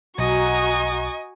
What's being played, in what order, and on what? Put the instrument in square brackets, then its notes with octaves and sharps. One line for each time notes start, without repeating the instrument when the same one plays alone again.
[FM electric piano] B1 [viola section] F#4 A#5 [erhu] D#5 [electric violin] G#5 C#6